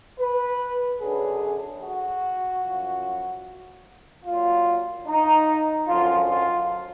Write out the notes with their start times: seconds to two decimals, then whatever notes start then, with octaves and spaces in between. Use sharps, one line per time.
0.19 B4
1.00 F#2 D3 F#3 G#4
1.82 F#4
2.63 F#2 F3
4.25 A#2 F#3 F4
5.07 D#4
5.87 F#2 D3 F3 F4
6.28 F4